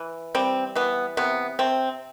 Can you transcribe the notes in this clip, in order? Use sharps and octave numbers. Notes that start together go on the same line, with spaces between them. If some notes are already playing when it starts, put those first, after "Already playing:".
Already playing: E3
G3 C4
E3 B3
C3 B3
C3 C4